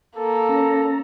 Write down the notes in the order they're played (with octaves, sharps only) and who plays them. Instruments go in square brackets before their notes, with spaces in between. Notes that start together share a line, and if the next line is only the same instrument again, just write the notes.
[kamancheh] A#3 [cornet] A4
[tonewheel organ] C#4 A#5